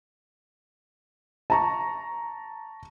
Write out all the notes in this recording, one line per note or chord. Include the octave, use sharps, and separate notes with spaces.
A5 A#5 C#6